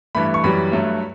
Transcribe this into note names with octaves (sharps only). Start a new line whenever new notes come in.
G2 E3 A3 B5
C#6
F#2 E3 G3 B5
G2 F#3 A3